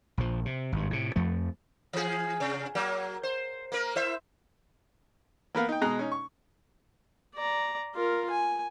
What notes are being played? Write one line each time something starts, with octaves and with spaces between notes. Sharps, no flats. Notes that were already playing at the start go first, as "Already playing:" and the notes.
A#1 F3
C3
G#1 G2
A2 C3
F2 F3 A3
E3 G#4
C3
F#3 A#3
C5
A#3 A#4
E4 C5 E5
A#3 B3 A#4 F5
D#4 G5
B2 G#3 D#5 A#5 F#6
C#4 D#4
C#6
D5 A#5
F4 A#4
G#5